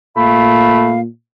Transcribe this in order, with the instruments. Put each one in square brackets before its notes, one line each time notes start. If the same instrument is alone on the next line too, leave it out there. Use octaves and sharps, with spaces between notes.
[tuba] A#2 [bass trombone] A3 [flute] F5 [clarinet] B5